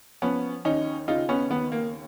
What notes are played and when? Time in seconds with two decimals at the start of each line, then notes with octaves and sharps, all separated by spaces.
0.22 F3 B3 C#4
0.65 D#2 C#4 D#4
1.08 C#3 D#4 F4
1.29 B3 C#4
1.50 D#2 B3
1.72 A#3